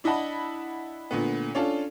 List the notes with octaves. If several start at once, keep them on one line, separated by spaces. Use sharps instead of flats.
D4 E4 D#5 F#5 A5 B5
A#2 D3 A3 B3
C#4 D4 F4 A4